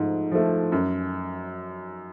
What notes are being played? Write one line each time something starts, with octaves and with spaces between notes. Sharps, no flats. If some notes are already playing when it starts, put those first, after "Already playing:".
Already playing: G#2 F3 A3
F3 A3
F#2